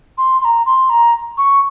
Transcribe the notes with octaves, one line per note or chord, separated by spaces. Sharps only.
C6
C6
A#5
C6
A#5
C#6